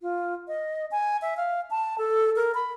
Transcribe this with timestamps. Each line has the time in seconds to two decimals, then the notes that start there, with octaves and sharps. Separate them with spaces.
0.01 F4
0.48 D#5
0.91 G#5
1.22 E5
1.37 F5
1.71 A5
1.98 A4
2.36 A#4
2.55 B5